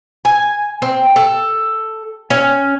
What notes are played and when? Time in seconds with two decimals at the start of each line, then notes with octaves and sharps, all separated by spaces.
0.25 G#5
0.82 C4
1.16 A4
2.30 C#4